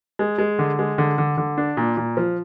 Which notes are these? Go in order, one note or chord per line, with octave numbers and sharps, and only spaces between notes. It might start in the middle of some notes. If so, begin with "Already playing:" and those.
G#3
G#3
D3
G#3
D3
D3
D3
D4
A#2
A#2
F3